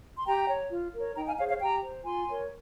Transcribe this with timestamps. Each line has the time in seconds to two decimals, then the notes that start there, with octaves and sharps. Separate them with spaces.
0.17 C6
0.26 G4 G5 A#5
0.49 C#5
0.71 F4
0.93 A#4 C#5
1.16 D#4 G5 A#5
1.27 F5 G#5
1.38 G#4 C5 C#5 F5
1.49 C#5 F5
1.60 G4 G5 A#5
1.82 C5
2.05 F4 G#5 C6
2.28 A#4 C#5